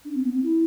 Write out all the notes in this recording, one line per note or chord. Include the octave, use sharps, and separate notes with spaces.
D4
C4
B3
C4
E4